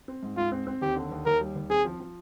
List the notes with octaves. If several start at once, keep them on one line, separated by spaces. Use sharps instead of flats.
C4
G#2
G#2 F4
C4
C4
D#2 G4
D3
D#2
D#2 A#4
G3
D#2
C4 G#4
F3
F3